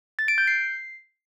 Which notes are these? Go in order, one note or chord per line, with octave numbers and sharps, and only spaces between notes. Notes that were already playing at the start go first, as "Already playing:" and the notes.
A6
D7
G6
C7